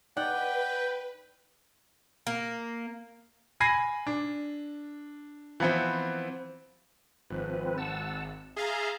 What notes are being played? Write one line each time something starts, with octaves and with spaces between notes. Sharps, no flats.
D#4 B4 D5 F#5 G5
A#3
G#5 B5 G#6 A#6 C7 D#7
D4
E3 F3 B3 C4
G#1 F3 C4 B4
F#5 A5 E6
G#4 E5 F5 A5 A#5 C6